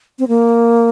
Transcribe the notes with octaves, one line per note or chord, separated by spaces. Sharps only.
C4
A#3